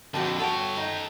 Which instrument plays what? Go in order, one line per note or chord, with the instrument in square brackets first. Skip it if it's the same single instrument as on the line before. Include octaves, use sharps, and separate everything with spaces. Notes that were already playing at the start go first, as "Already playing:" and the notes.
[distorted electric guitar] F2 D3 [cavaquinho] F#4 G5 A5
[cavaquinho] F#4 C#5 A5 [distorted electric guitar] A4 G5
[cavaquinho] D#4